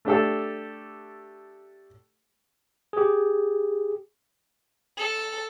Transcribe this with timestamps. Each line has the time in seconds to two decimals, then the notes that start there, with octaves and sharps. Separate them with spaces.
0.05 A3 D4 G4 A4
2.93 G4 G#4
4.97 A4